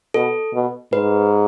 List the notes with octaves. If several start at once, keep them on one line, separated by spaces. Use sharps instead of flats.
B2 A4
B2
G#2 B4